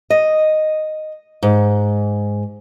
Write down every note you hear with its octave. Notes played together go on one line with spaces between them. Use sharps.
D#5
G#2